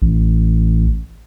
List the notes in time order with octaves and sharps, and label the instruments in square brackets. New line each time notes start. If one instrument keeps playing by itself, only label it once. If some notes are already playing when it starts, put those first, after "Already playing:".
[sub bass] A1